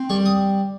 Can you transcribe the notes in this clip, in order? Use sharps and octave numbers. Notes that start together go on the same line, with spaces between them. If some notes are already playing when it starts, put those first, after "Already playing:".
Already playing: C4
G3 C#6
D#6